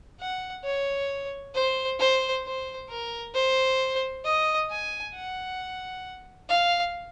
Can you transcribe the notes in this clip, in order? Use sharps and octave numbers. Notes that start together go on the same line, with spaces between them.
F#5
C#5
C5
C5
C5
A#4
C5
D#5
G#5
F#5
F5